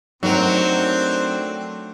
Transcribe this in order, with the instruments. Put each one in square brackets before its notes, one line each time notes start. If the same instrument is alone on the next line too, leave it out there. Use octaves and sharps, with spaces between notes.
[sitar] F#3 [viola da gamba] A3 D4 [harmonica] C4 [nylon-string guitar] D#4 A#4